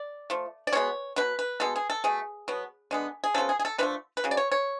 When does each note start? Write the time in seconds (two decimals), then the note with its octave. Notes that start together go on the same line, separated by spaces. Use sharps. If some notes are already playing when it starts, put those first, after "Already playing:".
Already playing: D5
0.30 F3 A3
0.67 D5
0.73 B2 G#3 B3 C#5
1.16 B2 F#3 B4
1.39 B4
1.60 B2 G#3 B3 A4
1.76 G#4
1.90 A4
2.04 B2 A3 G#4
2.48 B2 F#3 B3
2.91 D3 G#3 B3
3.24 G#4
3.34 C#3 F3 B3 A4
3.49 G#4
3.59 G#4
3.65 A4
3.78 D3 F3 A3 B4
4.17 B4
4.24 C#3 F#3
4.31 D5
4.37 C#5
4.52 C#5